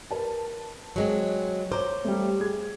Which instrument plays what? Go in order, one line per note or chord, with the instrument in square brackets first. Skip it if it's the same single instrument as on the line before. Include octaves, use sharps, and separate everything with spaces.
[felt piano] A#4 B4 A5
[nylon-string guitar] F#3 G#3 C4
[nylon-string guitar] C5 [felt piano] C#5 A#5 D6
[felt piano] G3 A3
G#4 G#6